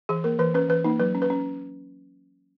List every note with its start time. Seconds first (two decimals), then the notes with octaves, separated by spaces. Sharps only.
0.09 E3 G#4
0.24 A#3 A#4
0.39 E3 B4
0.54 C#4 B4
0.69 E3 B4
0.84 A#3 D#4
1.00 F#3 B4
1.15 C#4
1.22 B4
1.30 C#4